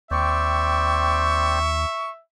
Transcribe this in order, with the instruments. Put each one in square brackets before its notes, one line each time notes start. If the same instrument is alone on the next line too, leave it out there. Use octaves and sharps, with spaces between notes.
[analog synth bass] D#2 [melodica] C4 D5 G5 [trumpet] E5 [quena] C#6